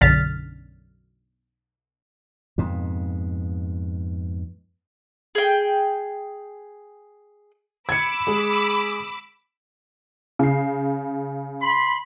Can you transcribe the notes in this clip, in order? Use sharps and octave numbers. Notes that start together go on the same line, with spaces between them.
B1 F#2 D3 F6 A6 B6
F2 G#2 B2
G#4 G5
B5 D6 E6 G#6 C#7
G#3 G#4
C#3 C7
B5 C6